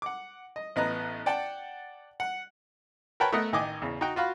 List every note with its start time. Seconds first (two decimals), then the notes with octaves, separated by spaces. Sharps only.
0.02 F#5 D6
0.56 D#5
0.76 A1 B3 D#5 A#5 F#6
1.26 D5 F#5 G5 A5
2.20 F#5
3.20 A#4 B4 C#5 G5 A5 B5
3.32 A3 B3 A#4 D#5 E5 F#5
3.53 A1 D#3 D#5 G#5 D6
3.82 E2 C#3
4.01 D#4 F#4 G5
4.16 F4 F#4 F5 B5